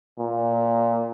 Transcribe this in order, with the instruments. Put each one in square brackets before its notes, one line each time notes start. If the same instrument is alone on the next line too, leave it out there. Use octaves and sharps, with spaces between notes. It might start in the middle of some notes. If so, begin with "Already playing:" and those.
[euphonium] A#2